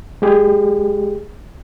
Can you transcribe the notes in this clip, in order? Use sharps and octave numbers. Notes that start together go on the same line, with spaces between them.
G#3 G4 G#4